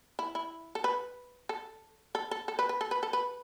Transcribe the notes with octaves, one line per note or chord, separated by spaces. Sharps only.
E4
E4
A4
B4
A4
A4
A4
A4
B4
B4
A4
B4
A4
B4